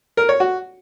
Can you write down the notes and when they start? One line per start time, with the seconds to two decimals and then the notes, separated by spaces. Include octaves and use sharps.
0.17 A#4
0.29 C#5
0.40 F#4